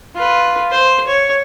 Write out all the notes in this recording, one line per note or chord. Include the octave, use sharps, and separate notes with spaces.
F4 B4
C5
C#5